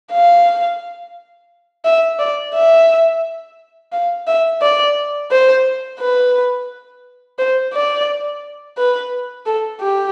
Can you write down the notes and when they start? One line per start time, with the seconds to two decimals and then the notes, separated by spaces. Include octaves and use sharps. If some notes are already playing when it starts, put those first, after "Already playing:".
0.12 F5
1.85 E5
2.19 D5
2.54 E5
3.92 F5
4.27 E5
4.62 D5
5.31 C5
6.00 B4
7.39 C5
7.74 D5
8.78 B4
9.46 A4
9.81 G4